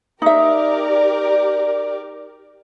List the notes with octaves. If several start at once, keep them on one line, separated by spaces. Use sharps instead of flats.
D#4 G4 A#4 D5 E5